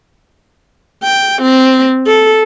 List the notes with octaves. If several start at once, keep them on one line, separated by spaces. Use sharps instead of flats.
G5
C4
A4